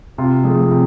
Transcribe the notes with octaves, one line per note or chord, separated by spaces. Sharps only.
C3 F4
F3 A3 G#4
C3